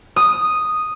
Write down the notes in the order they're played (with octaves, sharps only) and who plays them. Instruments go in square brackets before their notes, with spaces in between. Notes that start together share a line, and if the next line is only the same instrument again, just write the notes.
[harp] D#6